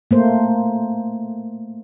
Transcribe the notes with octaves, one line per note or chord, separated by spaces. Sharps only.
A3 A#3 C5